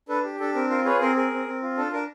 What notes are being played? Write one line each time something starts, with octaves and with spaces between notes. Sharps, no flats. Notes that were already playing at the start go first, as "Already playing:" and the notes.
D4 A4 B4
G4
D4 A4
C4 A#4
F4 A#4 C5
G#4 B4 C#5
C4 A#4 C5
G#4 A#4
C4
C4
F4
D4 A4
D4 A#4